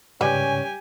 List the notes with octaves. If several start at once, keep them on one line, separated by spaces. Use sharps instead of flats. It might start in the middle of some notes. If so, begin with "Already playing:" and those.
G#2 C#3 G3 C#4 G4 B4 G#5